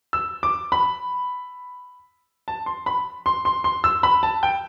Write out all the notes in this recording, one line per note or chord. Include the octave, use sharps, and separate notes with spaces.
E6
D6
B5
A5
C6
B5
C6
C6
C6
E6
B5
A5
G5